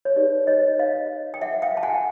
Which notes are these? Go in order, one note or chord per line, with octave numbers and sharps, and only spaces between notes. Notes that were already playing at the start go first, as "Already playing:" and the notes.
C#5
D#4 G4 B4 D5
C#5 D#5
D#5 F5
G5
E5 F#5
F5 G5
A5
F#5 G#5